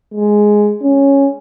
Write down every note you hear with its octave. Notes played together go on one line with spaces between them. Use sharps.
G#3
C#4